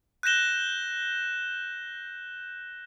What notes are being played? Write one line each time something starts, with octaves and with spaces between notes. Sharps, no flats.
F#6 G6 A#6 E7 G7